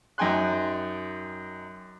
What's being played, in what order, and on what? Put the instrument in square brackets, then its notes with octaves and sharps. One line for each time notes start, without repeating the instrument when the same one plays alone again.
[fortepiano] F#2 D#4 G5 G#5 C6 F#6